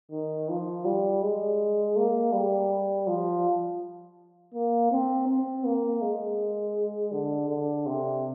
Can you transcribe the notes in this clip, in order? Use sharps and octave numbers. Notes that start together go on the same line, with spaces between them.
D#3
F3
G3
G#3
A#3
G3
F3
A#3
C4
C4
A#3
G#3
D3
D3
C3